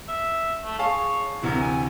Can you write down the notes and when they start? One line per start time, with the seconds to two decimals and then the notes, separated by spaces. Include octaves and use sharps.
0.09 E5
0.65 A3
0.79 G#4 C#5 F5 A5
1.42 D2 C3 E3 A#4
1.60 G#5